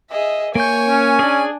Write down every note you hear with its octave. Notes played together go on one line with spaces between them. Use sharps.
G#4 D#5 E5
A#3 C#5 G#5 C#6 G6
C#4
D4 G#4 D5